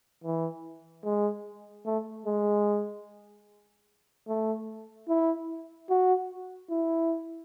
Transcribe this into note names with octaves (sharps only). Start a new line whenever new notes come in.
E3
G#3
A3
G#3
A3
E4
F#4
E4